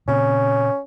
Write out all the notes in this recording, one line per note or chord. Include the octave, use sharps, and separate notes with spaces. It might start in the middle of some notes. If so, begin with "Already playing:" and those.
A#2 C#3 C4 C#4